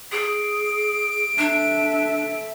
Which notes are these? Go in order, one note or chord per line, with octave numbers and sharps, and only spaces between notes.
G#4 D7
D4 A4 E5